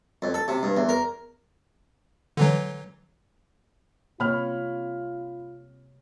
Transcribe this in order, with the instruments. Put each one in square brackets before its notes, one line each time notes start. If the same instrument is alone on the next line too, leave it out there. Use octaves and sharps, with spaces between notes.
[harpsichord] F2
A4
C3
G2
E2
A#4
[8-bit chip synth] D3 E3 F#3
[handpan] C3 C#5 [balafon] A#3 [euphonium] F4 [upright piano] B5 F6